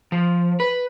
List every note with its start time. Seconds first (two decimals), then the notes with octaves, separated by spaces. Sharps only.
0.12 F3
0.60 B4